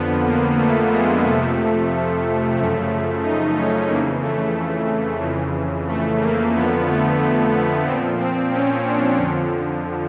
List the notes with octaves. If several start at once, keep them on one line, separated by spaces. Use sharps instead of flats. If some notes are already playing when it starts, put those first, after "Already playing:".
Already playing: F2 D3 F3 B3
A#3
A3
G#3
F2 C3 F3 A3
F#2 C#3 F3 A3
D#4
C#4
F2 C#3 E3 A#3
A3
F2 C#3 E3
A3
A#3
F2 D3 F3 B3
A3
A3
B3
A#2 F3 C4
C4
C#4
D4
F2 D3 F3